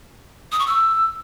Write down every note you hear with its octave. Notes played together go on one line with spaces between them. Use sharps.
D#6
C#6
E6